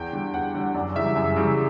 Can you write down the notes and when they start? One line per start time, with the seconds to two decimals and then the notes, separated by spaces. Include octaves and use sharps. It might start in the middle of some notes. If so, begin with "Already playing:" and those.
Already playing: E2 G5
0.13 D3 G3
0.34 E2 F#5
0.55 D3 G3
0.74 F#2 D5
0.95 C#3 E3 G3 E5
1.16 F#2
1.36 C#3 E3 G3